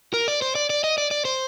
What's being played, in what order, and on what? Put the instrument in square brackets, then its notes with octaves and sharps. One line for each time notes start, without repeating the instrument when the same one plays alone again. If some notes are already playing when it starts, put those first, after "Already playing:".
[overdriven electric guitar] A#4
D5
C5
D5
D5
D#5
D5
D5
C5